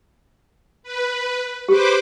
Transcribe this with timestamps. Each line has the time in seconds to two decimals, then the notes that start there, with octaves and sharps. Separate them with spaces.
0.83 B4
1.69 G4 G#4 B4 C5 D6